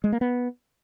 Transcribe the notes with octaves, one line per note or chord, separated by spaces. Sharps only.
G#3
A#3
B3